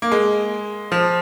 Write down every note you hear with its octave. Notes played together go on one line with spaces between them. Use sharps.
A#3
G#3
F3